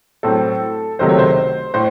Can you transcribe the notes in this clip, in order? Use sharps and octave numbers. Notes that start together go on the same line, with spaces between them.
A2 F#3 C4 A4
C#2 C3 D#3 F#3 A3 C5
C#5
C5
A2 C5